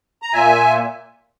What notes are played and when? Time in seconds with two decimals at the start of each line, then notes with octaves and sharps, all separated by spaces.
0.22 A#5
0.33 A#2 E5 G#5